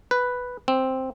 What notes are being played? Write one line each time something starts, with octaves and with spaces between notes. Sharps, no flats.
B4
C4